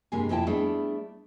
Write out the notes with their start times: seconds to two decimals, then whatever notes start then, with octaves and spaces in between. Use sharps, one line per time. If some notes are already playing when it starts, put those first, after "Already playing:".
0.12 G2 C3 G#3 A#3 G#5
0.29 F2 F3 C4 E4 G5 A5
0.47 G3 A3 B3 D4 E4 G#4